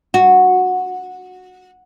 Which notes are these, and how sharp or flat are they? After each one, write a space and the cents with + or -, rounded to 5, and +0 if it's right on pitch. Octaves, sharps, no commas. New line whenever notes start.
F#4 -10